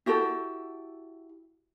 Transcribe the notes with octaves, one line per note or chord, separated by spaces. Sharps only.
E4 F#4 G4 A4